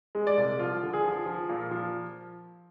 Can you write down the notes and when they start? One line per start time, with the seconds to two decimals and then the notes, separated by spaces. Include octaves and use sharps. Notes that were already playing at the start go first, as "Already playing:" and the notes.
0.15 G#3
0.27 D5
0.37 C2
0.59 F3 F4
0.83 D3
0.93 G#4
1.04 F3
1.26 F3
1.49 A#2
1.71 F3